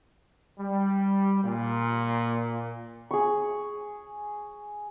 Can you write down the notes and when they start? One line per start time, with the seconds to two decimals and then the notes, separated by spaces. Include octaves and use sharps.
0.59 G3
1.43 A#2
3.11 G#4 C#6